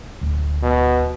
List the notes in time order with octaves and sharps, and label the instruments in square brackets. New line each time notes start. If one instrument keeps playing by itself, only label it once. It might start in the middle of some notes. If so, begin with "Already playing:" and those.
[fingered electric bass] D1 D2
[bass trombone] B2